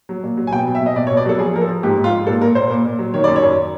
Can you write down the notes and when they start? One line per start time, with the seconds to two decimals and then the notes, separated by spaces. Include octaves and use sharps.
0.09 F#3
0.23 A#2
0.37 F#3
0.47 G#5
0.53 B2 G5
0.67 F#3
0.75 E5
0.81 B2 D#5
0.96 B2 D5
1.07 C#5
1.11 B2
1.17 D5
1.25 F#3 A4
1.39 F3 G#4
1.54 F3 A#4
1.62 A4
1.68 F3
1.83 G#2 G4
1.98 G#2
2.04 F4
2.12 G#2
2.27 A#2 A4
2.41 A#2 A#4
2.55 A#2 C5
2.70 A#2
2.85 A#2
2.99 F#3
3.14 D#3 C#5
3.24 F#2 D5
3.36 C#5
3.42 F#2